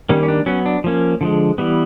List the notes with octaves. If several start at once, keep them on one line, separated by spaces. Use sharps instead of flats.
D#3 G3 A#3 C#4
C#4
D4
F#3 B3 C#4
D4
F3 A#3 C#4
D3 F3 G#3
E3 G3 B3